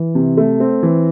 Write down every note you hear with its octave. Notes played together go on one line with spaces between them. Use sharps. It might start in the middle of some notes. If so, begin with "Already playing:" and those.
Already playing: E3
C3
A3
C4
E3